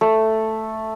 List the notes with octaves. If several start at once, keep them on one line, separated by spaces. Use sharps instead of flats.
A3